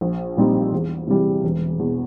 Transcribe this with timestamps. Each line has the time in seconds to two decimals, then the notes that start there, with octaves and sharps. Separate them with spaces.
0.01 A#1
0.37 A#2 G3 C4 D#4
0.72 E2
1.08 C3 E3 G3
1.44 E1
1.79 E2 B2